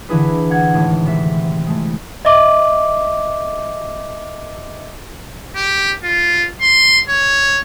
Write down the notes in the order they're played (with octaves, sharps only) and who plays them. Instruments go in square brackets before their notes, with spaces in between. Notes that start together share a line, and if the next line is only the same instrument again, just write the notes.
[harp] D3 E3 E4 G#4 B4
F#5 G#6
G#1 A2
C3 E5
G#3 A3
[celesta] D#5 E5 D6
[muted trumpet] G4
F4
C6
C#5